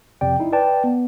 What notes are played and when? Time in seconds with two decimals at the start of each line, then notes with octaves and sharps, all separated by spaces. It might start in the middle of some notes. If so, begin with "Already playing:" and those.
0.21 F2 C3 D5 G5
0.40 D#4 E4
0.52 B4 D5 G5 A5
0.84 B3